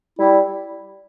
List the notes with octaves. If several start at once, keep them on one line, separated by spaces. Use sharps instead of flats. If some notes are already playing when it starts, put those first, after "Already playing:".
G3 E4